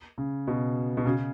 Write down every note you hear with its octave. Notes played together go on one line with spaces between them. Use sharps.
C#3
B2
B2
C#3